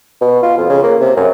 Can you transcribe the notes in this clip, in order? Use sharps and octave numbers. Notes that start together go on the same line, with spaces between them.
B2
F4
F2
C#3
A#3
C3
F#2